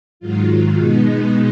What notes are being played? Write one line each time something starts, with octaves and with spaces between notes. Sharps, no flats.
G#2 D#3 F#3 F4
B2 G#3 B3 D#4